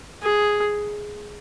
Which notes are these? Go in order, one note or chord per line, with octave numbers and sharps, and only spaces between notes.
G#4